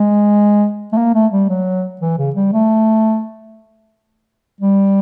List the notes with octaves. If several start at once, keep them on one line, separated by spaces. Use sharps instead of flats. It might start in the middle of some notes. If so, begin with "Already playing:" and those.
Already playing: G#3
A3
A#3
A3
G3
F#3
E3
C#3
G3
A3
G3